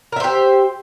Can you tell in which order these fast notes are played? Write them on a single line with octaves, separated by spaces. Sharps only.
A#4 E5 C5 G4